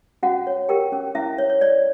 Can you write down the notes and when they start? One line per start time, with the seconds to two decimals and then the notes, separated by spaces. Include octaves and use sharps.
0.23 C#4 F#4 F#5
0.47 C#5
0.69 G4 A#4 G5
0.92 C#4
1.15 C#4 E4 E5
1.38 C#5
1.50 C#5
1.61 C#5 D5